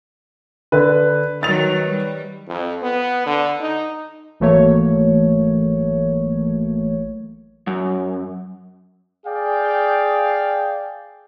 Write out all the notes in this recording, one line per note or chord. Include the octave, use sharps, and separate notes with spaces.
D3 B4
D#3 F#3 A6 F7
G3
F2
B3
D3
D#4
G#1 E3 F#3 A3 A#3 C#5
F#2
G#4 D5 F5 G5